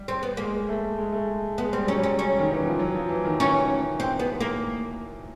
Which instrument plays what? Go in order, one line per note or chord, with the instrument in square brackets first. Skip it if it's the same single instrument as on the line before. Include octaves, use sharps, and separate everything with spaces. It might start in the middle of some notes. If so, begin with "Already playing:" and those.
Already playing: [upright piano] G3
[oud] C4
B3
[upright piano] G#3 [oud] A#3
[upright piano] A3
G#3
A3
G#3
[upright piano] G#3 [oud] B3
[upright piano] G3 [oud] C4
[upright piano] F#3 [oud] C#4
[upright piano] G3 [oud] C#4
[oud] C#4
[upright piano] D#3
E3
F3
F#3
F3
E3
D#3
[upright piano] E3 [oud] C#4
[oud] C4
B3
A#3